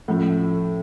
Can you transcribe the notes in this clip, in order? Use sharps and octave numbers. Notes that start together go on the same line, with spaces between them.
A2 F3 A3 C#4 F4 A4